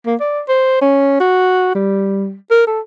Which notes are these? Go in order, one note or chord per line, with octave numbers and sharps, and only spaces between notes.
A#3
D5
C5
C#4
F#4
G3
A#4
A4